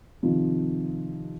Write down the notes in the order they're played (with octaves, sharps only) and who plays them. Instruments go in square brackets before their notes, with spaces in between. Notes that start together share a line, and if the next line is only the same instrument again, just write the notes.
[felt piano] C3 D#3 F3